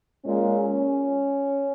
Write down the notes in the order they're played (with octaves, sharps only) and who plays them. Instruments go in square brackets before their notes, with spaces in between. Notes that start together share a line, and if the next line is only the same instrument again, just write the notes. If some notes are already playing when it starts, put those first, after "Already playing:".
[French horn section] A#2 G#3 C#4